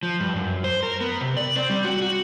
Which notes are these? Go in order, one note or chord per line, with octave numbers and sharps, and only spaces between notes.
F3
G2
F#2
C5
A#4
B3
C3
D5
C4
G3
F#4
F#4